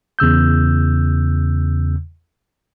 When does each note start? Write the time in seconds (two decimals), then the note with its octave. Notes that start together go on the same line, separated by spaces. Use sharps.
0.19 E2 C#3 E6 G6